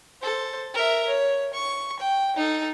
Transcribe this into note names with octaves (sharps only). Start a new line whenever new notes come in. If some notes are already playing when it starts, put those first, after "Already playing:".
A4 C5
A#4 E5
C#5
C#6
G5
D#4 A4